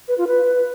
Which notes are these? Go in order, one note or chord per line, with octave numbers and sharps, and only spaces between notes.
B4
F4
B4